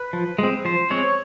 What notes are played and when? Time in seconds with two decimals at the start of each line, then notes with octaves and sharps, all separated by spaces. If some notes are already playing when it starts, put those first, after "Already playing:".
Already playing: B4
0.13 F3
0.39 G#3 C4
0.65 F3 C5
0.90 G#3 C4 C#5